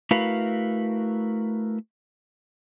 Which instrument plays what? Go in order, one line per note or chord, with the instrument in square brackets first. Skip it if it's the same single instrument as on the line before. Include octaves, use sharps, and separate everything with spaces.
[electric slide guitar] A3 E4 F#4 A#4 B4 F5